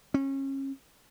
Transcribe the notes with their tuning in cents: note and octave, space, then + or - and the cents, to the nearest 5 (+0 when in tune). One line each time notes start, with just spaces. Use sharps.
C#4 -30